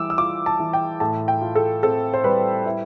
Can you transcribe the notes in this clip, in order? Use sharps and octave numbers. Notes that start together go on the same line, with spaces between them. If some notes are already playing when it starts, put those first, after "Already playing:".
Already playing: E3 G3 D6 E6
E6
F4 D6
A5
E3
G5
A2 A5
G5
F4
A4
C4 A4
C5
G3 B4
E4